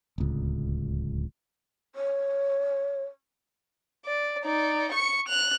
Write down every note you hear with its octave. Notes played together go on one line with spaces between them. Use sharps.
D1 C#2
C#5
D5
D#4 D5
C#6 C#7
F#6 F7